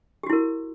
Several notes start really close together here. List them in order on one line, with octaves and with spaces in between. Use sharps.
G4 F#4 E4 A#4